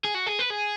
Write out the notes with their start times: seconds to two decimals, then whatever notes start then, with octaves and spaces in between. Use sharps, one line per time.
0.04 G#4
0.15 F#4
0.26 G#4
0.39 B4
0.50 G#4